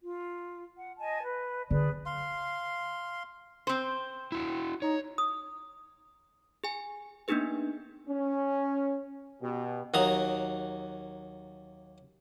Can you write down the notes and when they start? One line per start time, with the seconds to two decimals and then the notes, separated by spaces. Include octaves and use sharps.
0.03 F4
0.77 F#5
0.99 D#5 G#5 A5
1.22 B4
1.71 D3 G#4 B4 D5
2.06 F5 C6
3.67 C4 C5
4.32 E4 F#4
4.82 D#4 C#5
5.18 D#6
6.64 G#4 G#5
7.28 A#3 B3 D4 D#4 G#4 B4
8.07 C#4
9.40 B2 G4
9.94 D#2 F#3 A#5 D#6